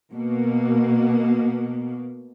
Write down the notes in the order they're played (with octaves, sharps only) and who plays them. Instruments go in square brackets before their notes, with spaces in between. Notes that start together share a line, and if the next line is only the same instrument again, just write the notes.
[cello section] B2 A#3